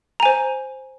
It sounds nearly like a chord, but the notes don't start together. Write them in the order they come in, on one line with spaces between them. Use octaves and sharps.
A#5 G#5 C5